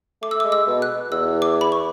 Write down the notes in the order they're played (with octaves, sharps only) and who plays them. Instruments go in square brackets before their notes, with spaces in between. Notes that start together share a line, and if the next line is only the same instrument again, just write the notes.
[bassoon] A3 [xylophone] D6
[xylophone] E6
[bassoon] G#3 [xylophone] D6
[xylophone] E6
[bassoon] B2
[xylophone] F#6
[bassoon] E2 [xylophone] E6
[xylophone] D6
B5
C#6